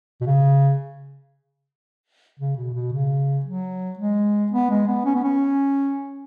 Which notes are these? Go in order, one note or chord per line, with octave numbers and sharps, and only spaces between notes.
B2
C#3
C#3
B2
B2
C#3
F#3
G#3
B3
G#3
B3
C#4
B3
C#4